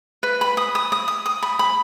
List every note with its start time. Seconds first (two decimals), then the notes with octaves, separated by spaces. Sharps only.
0.23 B4
0.41 B5
0.57 D#6
0.75 D#6
0.92 D#6
1.08 D#6
1.26 D#6
1.43 B5
1.59 B5